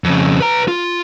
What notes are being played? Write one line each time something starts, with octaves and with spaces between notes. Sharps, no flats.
F2 C#3
B4 A#5
F4